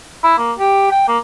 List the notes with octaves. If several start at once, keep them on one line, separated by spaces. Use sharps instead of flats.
E4
A#3
G4
G5
A#3